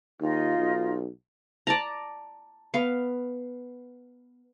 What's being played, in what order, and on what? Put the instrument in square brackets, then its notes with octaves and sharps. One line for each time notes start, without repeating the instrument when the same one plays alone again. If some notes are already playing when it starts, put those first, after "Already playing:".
[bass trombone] D#2 [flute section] D#4 F4
[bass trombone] B1
[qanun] D5 A5 A#5
B3 F5